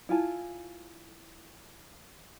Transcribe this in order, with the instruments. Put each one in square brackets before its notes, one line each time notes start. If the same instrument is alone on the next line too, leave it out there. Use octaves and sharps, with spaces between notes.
[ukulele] E4 F4 G#5 A5